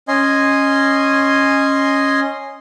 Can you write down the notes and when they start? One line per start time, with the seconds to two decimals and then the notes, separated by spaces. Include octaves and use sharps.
0.08 C#4 D#5 G#5 C6